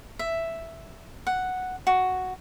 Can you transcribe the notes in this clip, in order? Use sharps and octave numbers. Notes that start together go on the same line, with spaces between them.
E5
F#5
F#4